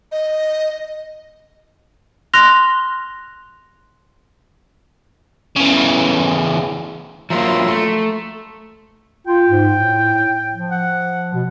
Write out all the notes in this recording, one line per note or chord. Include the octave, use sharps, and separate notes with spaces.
D#5
C6 F6 F#6 A#6 F7
C#3 E3
F3 F#3 A#3 E5 A#5 C6
A3
F4 G5
G#2
A2
F3
F#5
B2